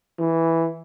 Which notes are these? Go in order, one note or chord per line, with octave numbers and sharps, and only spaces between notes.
E3